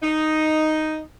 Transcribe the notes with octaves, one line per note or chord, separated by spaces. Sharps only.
D#4